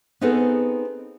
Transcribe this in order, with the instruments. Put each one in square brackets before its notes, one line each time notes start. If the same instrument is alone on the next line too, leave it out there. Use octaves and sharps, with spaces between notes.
[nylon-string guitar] B3 C4 D#4 G#4 A4 B4